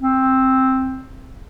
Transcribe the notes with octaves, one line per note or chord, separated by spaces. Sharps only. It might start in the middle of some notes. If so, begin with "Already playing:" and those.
C4